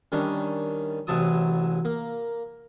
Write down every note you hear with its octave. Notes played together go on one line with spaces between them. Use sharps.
D#3 G3 C#4 D4
A1 C3 F#3 E4 A5 D#6
A#3